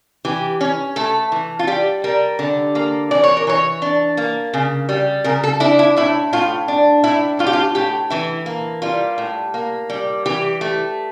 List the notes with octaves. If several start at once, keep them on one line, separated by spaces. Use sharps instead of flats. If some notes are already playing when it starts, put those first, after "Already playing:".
E3 G4
C#4
A3 A4
E3
F4
G3 G4
G3 A#4
D3
A#3
E3 D5
C#5
A#4
E3 C#5
D4
A#3
C#3
G3
C#3 A#4
A4
D4 E4
E4
A2 E4
A2 F4
D4
A2 E4
A2 F4
G4
F4
A2 G4
E3 E4
A#3
G3 F4
A2
A#3
G3
E3 G4
A3